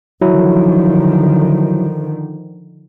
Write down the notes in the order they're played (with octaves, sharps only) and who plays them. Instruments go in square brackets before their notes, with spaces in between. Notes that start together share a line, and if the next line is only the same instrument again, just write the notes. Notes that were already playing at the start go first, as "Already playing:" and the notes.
[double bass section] D3 D#3 F3 [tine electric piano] F#3 E4